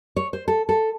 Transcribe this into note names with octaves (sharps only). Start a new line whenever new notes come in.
C#5
C5
A4
A4